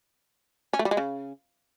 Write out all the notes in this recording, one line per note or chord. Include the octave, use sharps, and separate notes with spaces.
C#4
A3
G3
G#3
C#3